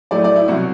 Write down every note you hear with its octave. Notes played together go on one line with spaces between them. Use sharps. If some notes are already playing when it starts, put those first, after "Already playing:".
A2 F#3 A3 D5
D5
E4
C2 B2 F#3 F#4